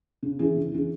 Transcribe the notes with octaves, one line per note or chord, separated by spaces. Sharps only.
C#3
E3 C#4 G#4
C#3
E3 C#4 G#4